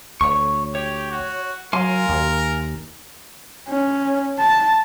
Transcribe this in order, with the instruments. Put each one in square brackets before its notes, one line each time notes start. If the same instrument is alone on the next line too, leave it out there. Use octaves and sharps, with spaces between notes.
[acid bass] D2 [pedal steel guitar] C#5 C#6
[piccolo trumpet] G4 [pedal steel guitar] C#5
[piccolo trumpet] F#4
[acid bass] F#3 [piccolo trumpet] A#4 [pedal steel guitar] F5 G#5 C6
[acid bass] D#2
[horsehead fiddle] C#4
A5